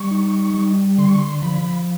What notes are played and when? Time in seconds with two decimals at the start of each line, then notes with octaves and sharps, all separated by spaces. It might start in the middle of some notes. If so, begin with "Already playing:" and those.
Already playing: G3 C#6
0.11 D#4
0.54 G3
0.98 D3 C6
1.08 C#6
1.18 C6
1.42 F3 B5